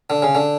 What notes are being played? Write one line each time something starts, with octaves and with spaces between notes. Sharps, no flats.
D3
C#3
D3